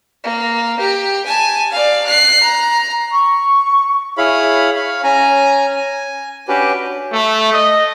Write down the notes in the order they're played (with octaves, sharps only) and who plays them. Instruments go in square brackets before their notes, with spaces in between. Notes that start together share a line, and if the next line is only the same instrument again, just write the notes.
[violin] A#3
G4
G#5 A5
D5 F5
F#6 C7
A#5
[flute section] C#6
[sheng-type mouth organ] E4 G#4 C#5 F5 B5
C#5 F5 B5
C#4 G#5 A#5
G#5
C#4 D4 F#4 G4 B4
[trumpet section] A3
D#5